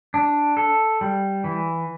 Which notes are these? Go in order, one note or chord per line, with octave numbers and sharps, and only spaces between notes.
D4
A4
G3
E3